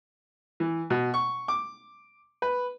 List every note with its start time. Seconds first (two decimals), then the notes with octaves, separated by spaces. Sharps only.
0.60 E3
0.90 B2
1.14 C#6
1.48 D6
2.42 B4